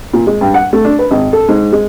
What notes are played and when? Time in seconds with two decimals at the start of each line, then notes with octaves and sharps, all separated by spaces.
0.13 A#2
0.27 G#3
0.41 G2
0.54 F#5
0.73 A3
0.85 D4
0.99 B4
1.11 G#1
1.33 A4
1.49 G#2
1.72 G#3